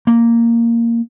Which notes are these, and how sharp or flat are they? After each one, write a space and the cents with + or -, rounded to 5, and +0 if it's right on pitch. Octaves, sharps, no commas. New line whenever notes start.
A#3 -5